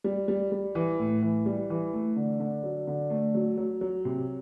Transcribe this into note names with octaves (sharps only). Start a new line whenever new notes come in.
G3
G3
G3
E3
A2
E3
G3
E3
A3
D3
D3
F#3
D3
A3
F#3
F#3
F#3
C3